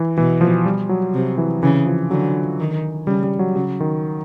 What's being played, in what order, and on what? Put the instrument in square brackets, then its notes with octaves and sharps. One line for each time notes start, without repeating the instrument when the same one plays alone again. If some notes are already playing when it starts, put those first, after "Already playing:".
Already playing: [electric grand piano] E3
[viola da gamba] B2 [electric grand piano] E3
[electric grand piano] F3
G3
F#3
[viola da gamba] C3
[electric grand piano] E3
[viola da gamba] C#3 [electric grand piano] E3
[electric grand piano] F3
[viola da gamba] D3 [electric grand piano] F#3
[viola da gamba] D#3
[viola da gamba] C#3 [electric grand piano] G3
[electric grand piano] G3
F#3
[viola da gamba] C#3 [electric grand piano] F#3
[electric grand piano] D#3